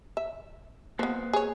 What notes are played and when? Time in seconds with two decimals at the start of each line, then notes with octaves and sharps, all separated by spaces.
0.17 E5
0.99 F3 A#3 B3 B4 C5
1.33 G#4 C#5